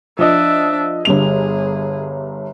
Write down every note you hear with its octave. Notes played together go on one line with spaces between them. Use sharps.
F3 D4 D#5 E5
G1 G2 G#4 F7